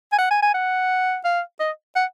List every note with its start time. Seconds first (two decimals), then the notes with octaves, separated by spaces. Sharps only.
0.12 G#5
0.18 F#5
0.31 G#5
0.42 G#5
0.54 F#5
1.25 F5
1.60 D#5
1.96 F#5